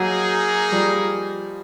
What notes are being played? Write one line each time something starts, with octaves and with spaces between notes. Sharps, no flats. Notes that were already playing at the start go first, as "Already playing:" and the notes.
Already playing: F#3 A#3 D#4 G#4
F3 G3